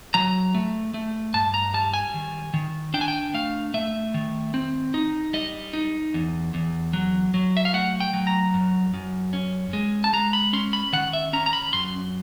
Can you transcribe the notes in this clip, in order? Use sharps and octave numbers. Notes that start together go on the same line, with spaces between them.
F#3 A#5
A3
A3
G2 A5
A#5
G3 A5
G#5
D#3
D#3
D4 G5
G#5
G5
A3 F5
A3 E5
D#3
C4
D#4
G3 D#5
D#4
E2
E2
F#3
F#3
E5
F5
A3 F#5
G5
F#3
A#5
F#2
F#2
C#4
G#3
A5
G#3 A#5
B5
C#4 C6
B5
D#3 F#5
E5
C#4 A#5
A#5
B5
F#2 C6